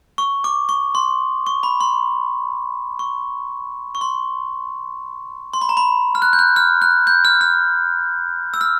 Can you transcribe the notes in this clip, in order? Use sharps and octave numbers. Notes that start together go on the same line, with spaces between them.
C#6
D6
C#6
C6
C#6
B5
C6
C#6
C#6
C6
C6
B5
A#5
B5
F6
F#6
G6
F#6
F6
F#6
G6
F6
F6
E6
F6